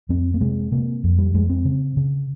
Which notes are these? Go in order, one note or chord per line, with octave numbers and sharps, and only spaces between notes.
F2 C4
A#3
C3 G#3
C3 A#3
F2
G3
F2 G#3
C4
C#3
C#3